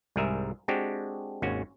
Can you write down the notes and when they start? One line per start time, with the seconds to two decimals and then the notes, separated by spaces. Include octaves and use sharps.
0.16 C2 G#2 G3 G#4 A#4 E5
0.68 G#3 C4 D4 F#4 G4
1.42 G#1 D#2 C#4 F#4 G#5